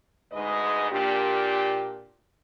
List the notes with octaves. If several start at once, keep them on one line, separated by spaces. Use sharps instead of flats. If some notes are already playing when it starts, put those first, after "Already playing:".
D2 G#2 G#3 B4 D#5
A#2 D4 G4